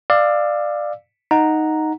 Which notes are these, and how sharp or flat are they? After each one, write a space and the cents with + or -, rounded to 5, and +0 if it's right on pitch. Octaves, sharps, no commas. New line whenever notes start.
D5 +20 F5 +0 E6 +0
D#4 +0 F#5 -5 A#5 +0